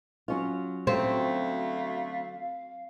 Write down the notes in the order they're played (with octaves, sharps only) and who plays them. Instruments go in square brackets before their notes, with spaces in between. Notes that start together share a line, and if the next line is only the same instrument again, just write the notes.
[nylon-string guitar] F#3 C#4 F4
[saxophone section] D2 A3 [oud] C4 [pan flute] F5